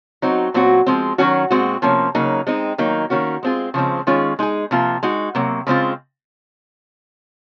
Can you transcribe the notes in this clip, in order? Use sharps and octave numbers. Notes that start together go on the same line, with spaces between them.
F#3 C4 D#4 F#4
A#2 F#3 C4 F#4
F3 G#3 C4
D#3 F#3 C#4 F#4
A#2 G#3 C4 F#4
C3 F3 A#3 C#4
C#3 F#3 A#3 D#4
G#3 C4 D#4
D#3 F#3 A#3 D#4
D#3 A#3 C#4 F#4
G#3 C4 F4 G#4
C#3 F3 G#3 C4
D#3 G#3 C#4 F4 G#4
G#3 D#4 G#4
C3 F3 A#3 F4
G#3 D#4 F#4
C3 F#3 A#3
C#3 G#3 C4 F4